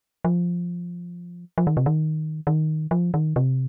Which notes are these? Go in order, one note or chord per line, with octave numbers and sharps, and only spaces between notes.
F3
F3
D#3
C3
D#3
D#3
F3
D#3
C3